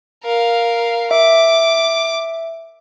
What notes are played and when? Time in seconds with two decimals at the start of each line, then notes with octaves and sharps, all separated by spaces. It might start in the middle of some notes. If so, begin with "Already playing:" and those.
0.24 A#4 F5
1.11 E5 D6